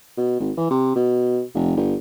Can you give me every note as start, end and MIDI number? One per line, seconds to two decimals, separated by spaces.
0.17 0.38 47
0.40 0.52 32
0.57 0.68 52
0.70 0.93 48
0.96 1.42 47
1.55 1.76 29
1.77 1.96 31